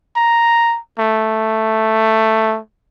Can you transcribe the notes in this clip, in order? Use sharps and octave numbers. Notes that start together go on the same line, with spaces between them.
A#5
A3